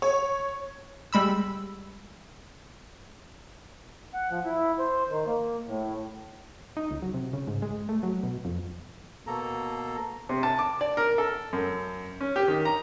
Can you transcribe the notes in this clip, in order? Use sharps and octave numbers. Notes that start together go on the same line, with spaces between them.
C#5
G3 G#3 B5 E6
F#5
F3
E4
C5
D#3
A#3
A2
D#4
C#2
F#3
C3
C#3
G#2
G#3
A3
F#3
B2
F2
B2 A#3 A4 A#5
C3
A5
D6
D5
A#4
A4
F#2
C#4
G4
D#3
A#5